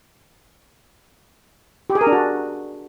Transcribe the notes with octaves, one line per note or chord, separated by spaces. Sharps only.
G4
G#4
A#4
D4
F#4